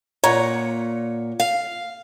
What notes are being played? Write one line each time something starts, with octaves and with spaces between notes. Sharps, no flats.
A#2 C#5 F#5 A#5
F5